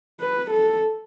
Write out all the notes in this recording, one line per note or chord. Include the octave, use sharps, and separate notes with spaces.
B4
A4